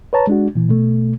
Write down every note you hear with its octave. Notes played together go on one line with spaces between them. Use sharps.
B4 C#5 A5 A#5
G#3 D4 F#4
A#2 E3
B2 A3